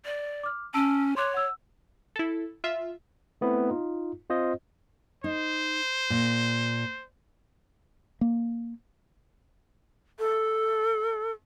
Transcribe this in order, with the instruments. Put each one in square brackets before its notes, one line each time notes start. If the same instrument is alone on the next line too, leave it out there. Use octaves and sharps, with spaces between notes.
[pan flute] D5
[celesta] D6 F6
[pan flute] C#4 [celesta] A5 E6 D7
[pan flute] C#5 [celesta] C6 D6 F#6
[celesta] F#5 E6
[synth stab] E4 A4
F4 E5
[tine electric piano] A3 B3 C4 E4 B4
D#4 F4
C4 F4 C5 D#5
[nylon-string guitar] D#4 [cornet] C5
[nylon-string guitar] A#2
[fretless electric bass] A#3
[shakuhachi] A4